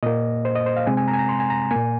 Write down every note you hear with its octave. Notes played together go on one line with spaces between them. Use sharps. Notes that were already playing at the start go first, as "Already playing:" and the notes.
A#2 A#3 D#5
C5
D#5
C5
F5
C3 G#3 C4 G#5
G#5
A#5
G#5
A#5
C6
G#5
A#5
A#2 A#3 G#5